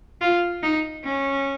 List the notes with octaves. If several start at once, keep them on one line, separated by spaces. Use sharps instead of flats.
F4
D#4
C#4